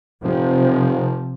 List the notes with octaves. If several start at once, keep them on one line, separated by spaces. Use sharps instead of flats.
F1 C3 F3